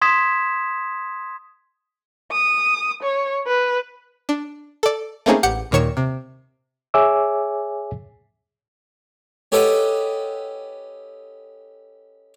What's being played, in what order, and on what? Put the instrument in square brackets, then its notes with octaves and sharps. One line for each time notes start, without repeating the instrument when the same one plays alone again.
[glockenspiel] C6 D#6 G#6 B6 E7
[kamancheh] D#6
C#5
B4
[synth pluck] D4
A4 D5
A3 A#3 C4 C#4 D#4 G#4
A1 G4 F#5 G6 C#7
D#2 A#2 D#3 C#5 C#7 E7
C3
[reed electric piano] G#4 C#5 E5 G#5 D6 E6
[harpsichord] C#4 G4 A4 B4 D#5 F#5